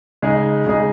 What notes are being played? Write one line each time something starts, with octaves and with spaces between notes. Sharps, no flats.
C#3 G#3 D#4 G#4
C#3 G#3 D#4 G#4